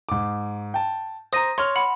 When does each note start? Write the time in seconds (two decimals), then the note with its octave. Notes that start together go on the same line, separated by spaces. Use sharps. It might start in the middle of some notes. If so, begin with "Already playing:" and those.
0.09 G#2 D6
0.74 G5 A5
1.33 C5 A#5 D#6 A#6 D#7
1.58 C#5 C6 F6
1.76 F#5 B5